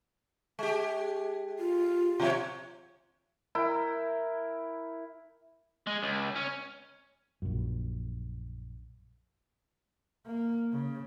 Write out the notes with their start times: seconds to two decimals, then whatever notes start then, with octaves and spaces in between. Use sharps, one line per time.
0.59 G#3 G4
1.59 F4
2.20 B2 F3 C#5
3.55 E4 A#4 G5
5.87 G#3
6.03 C#2
6.36 C#4
7.42 A#1 F#2
10.26 A#3
10.72 C#3